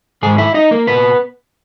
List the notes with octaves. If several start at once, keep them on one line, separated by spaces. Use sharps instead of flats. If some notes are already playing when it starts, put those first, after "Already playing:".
G#2 D#3 G#3 G#4
E4 E5
D#4 D#5
A#3 A#4
A#2 B3 B4